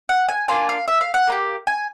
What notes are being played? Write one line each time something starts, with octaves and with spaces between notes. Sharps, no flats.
F#5
G#5
A#3 D4 F4 G#5
F5
E5
F5
F#5
A#3 D#4 G4
G#5